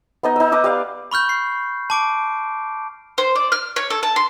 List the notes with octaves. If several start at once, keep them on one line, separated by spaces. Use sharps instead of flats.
B3 D#4 D#5
D#4 E6
B4 D#5 D6 D#6
G4 D5 F5
B5 C#6 F6 G6
C7
A5 D6 D7
C5
D5
F6
C#5
A4
A5
C6